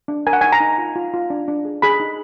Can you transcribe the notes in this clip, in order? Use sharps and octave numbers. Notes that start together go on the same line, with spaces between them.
D4
A#4 G#5
F#5
D#4 G#5
A#5
D#4
F4
F4
F4
D4
D4
G#4
G#4 B5
D#4